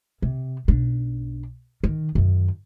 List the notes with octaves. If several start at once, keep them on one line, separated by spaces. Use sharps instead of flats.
C3
B1 D4
D#3
F#2 D#3